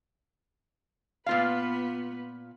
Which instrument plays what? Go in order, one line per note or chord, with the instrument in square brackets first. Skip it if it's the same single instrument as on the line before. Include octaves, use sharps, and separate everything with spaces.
[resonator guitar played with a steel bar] A#2 F4 F5 [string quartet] B3 B4